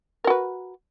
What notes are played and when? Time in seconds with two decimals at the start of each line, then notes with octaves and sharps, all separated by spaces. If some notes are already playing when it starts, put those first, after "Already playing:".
0.24 A#4
0.27 F#4
0.30 B4